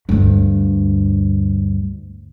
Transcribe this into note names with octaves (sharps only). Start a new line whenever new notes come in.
D2 G2